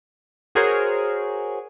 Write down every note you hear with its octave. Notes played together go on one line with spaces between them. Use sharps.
F#4 G#4 A#4 C5 C#5